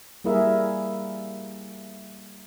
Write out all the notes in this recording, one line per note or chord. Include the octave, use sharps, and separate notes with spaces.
G3 A#3 E4 G#4 A#4 E5